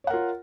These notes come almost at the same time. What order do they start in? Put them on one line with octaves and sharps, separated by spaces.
C#5 F#5 A#4 F4